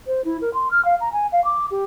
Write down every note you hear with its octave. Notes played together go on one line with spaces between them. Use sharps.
C5
E4
A#4
C6
F6
F5
A#5
G#5
F5
D6
G4